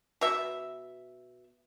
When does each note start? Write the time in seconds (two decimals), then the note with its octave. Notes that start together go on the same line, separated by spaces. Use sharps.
0.21 B2 E5